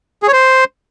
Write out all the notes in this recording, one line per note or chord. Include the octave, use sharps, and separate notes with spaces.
G#4
C#5
C5